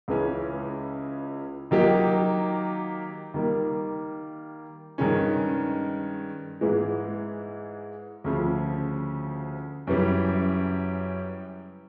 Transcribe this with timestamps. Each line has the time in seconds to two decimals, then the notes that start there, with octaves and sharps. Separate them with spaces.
0.08 C#2 C#3 E3 G#3 C#4
1.71 D#3 F#3 A#3 D#4 G4
3.34 D#3 G3 A#3
4.98 G2 D#3 G#3 C#4
6.61 G#2 E3 G#3
8.24 D2 C#3 F3
9.87 F#2 C#3 E3 G3